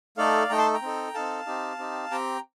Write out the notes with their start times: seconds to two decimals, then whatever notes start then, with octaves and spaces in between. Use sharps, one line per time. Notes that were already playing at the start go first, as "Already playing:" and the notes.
0.17 A3 D#4 A4 D5 F5
0.49 A3 D#4 A4 G5 A#5
0.58 A5 C6
0.74 G5 A#5
0.82 C4 D#4 A4
1.14 C4 D#4 A4 F5 A5
1.46 C4 D#4 G4
1.79 C4 D#4 G4
2.11 C4 G4 G5 A#5